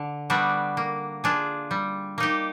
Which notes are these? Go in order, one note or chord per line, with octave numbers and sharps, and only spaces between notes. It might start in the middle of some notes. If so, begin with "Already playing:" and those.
Already playing: D3
G3 B3 D4 F#4
A#3
D4 F4 G#4
G3
A#3 D#4 G4